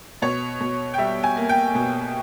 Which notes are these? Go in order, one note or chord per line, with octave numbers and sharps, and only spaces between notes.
B2 C#5
B2
G5
G3 E5
G#5
A#3
G5
B2